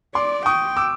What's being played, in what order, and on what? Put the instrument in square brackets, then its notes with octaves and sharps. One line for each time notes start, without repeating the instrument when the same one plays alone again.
[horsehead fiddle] D5 [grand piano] C6 D6
[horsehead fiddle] G5 [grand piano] C#6 D#6
[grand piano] D6 E6